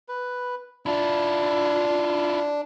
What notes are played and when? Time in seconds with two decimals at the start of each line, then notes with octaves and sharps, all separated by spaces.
0.09 B4
0.86 D4 E4 F4